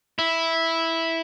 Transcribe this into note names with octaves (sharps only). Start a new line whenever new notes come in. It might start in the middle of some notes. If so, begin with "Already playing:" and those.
E4